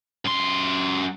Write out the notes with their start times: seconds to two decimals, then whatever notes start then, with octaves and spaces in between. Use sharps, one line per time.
0.25 F#2 C6